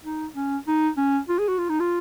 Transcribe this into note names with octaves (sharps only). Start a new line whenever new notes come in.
D#4
C#4
D#4
C#4
F4
G#4
F#4
F4
D#4
F4